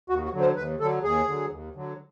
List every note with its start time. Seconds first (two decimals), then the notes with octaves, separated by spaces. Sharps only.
0.10 D#2 F#4
0.25 F#4
0.33 D3 F#3
0.41 C5
0.56 D#2 B4
0.80 D3 F#3 A4
1.03 D#2 G#4
1.28 D3 F#3
1.50 D#2
1.75 D3 F#3